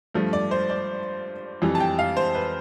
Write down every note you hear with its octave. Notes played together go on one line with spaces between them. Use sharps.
G2 F3 A3
D5
C5
D5
F2 E3 G3
A5
G5
F5
C5
B4